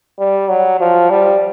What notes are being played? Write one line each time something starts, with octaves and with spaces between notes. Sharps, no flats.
G3
F#3
F3
G3